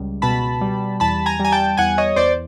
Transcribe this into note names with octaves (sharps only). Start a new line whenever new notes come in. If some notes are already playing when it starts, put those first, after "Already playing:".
Already playing: C#2 G3
B2 A5 B5
G3
E2 A5 B5
G#5 A#5
G3 G#5
G5 A5
E2 F#5 G#5
C#5 D#5
E2 C5 D5